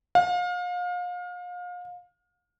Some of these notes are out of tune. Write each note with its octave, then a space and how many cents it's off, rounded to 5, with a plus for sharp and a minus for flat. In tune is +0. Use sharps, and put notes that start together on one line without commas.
F5 +35